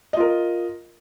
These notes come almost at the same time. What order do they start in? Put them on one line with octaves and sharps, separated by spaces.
D#5 F4 A#4